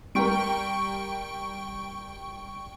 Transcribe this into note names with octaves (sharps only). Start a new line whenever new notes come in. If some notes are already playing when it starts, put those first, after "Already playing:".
G3 A#4 G5 C#6 D7